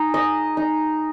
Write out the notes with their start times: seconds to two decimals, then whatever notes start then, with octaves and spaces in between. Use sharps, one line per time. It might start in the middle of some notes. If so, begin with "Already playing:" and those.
Already playing: D#4 G#4
0.14 D#5
0.57 D#4